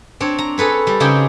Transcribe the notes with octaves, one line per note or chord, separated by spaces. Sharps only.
C4 D4 C#5
A#5
G#4 A4 B4 C#5
G3
C#3 C4 D#4 G4 G#4 G5